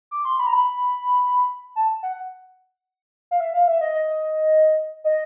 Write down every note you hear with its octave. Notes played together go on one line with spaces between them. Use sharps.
D6
C6
B5
A#5
B5
A5
F#5
F5
E5
F5
E5
D#5
D#5
D#5